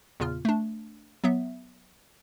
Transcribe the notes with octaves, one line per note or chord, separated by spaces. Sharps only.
E2 A#2 C#3 F4 F6
A3 D4
F#3 B3 E5